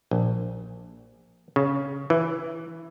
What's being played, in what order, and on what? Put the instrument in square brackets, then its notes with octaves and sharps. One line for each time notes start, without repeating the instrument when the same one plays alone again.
[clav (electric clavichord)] A#1
C#3
E3